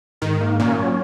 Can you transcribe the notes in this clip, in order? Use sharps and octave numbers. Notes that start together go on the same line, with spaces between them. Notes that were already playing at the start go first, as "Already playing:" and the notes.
G#2 D#3
A#3
A#2 C#4
F#3